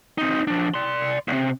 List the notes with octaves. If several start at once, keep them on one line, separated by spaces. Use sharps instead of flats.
C4 D#4
F3 D4
D5 C6
B1 C3